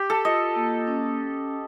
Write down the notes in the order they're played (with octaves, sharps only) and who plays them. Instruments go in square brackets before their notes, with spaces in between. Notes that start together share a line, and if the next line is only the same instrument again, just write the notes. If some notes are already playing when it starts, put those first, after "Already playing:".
Already playing: [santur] G4
A4
[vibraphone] F4 [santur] D#5
[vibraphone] A#3
C#4